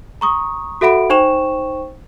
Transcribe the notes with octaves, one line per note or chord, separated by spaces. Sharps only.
A#5 C#6 D#6
F#4 A4 E5 F#5 B5 D7
D#4 C5 G5 C#6 E7